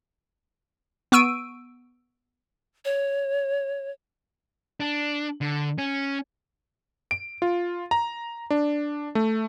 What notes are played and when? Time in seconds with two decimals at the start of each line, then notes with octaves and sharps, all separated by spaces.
1.12 B3 C#6 E6 D7 D#7
2.85 C#5
4.80 D4
5.41 D3
5.78 C#4
7.11 D7
7.42 F4
7.91 A#5
8.50 D4
9.15 A3